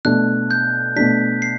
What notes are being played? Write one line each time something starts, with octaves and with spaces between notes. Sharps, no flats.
B2 A3 D4 F#6
G6
B2 A3 D4 B6
C7